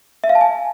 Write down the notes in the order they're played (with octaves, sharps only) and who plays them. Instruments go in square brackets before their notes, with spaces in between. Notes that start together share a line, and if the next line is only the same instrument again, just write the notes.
[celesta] E5
F5
A5
G#5